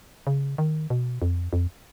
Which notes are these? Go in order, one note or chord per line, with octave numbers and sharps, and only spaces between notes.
C#3
D#3
B2
F2
F2